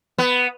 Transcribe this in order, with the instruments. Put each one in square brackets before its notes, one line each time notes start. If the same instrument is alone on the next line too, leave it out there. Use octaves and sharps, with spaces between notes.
[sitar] B3